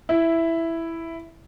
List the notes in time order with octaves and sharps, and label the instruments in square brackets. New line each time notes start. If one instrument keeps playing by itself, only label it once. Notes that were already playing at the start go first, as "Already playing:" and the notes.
[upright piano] E4